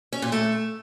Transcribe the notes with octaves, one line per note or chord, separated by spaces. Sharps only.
C#4
A#2
A3